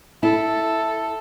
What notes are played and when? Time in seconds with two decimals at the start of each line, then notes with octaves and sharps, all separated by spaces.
0.23 E4 A4